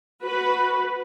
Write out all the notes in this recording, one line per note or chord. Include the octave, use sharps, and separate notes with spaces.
F#4 B4